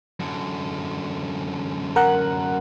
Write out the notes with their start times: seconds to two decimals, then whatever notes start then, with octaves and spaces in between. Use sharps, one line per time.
0.20 F#2 D3
1.96 A#4 F#5 F#6